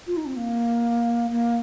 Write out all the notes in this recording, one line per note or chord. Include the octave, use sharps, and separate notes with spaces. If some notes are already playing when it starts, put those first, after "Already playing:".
F4
D#4
C4
A#3
A#3